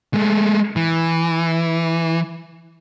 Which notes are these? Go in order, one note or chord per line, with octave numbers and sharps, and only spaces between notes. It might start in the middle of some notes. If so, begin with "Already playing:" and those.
G#3 A3
E3